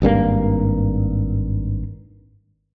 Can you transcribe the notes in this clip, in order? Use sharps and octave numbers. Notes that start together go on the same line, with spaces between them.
G#1 G2 D3 A#3